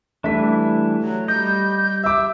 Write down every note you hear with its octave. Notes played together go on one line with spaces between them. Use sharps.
E3 G3 A3 D4 B6
F#3
G3 D#5 G6
E5 D6 E6